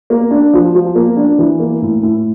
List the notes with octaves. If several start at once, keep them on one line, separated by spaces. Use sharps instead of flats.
A#3
D4
F3
F3
A#3
D4
E3
A#3
A2
A2